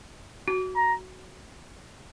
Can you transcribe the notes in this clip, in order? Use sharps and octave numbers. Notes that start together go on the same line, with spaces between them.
F#4
A#5